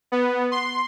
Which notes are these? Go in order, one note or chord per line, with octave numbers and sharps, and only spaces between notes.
B3
C6